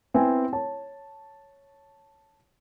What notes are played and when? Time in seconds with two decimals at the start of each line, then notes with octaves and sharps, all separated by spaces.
0.14 B3 C4 E4 G#5
0.53 C#5 A5